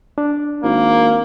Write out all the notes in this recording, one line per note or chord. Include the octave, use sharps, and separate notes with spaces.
D4
G#1 A#3